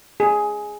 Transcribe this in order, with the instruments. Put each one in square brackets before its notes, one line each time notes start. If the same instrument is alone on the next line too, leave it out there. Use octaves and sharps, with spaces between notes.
[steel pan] G#4